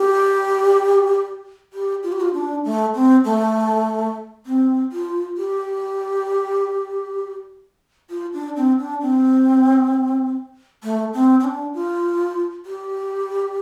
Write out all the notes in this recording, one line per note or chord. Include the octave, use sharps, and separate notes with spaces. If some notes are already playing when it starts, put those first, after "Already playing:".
Already playing: G4
G4
F4
G4
F4
D4
A3
C4
A3
C4
F4
G4
F4
D4
C4
D4
C4
A3
C4
C4
D4
F4
G4